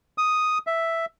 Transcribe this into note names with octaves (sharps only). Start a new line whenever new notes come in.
D#6
E5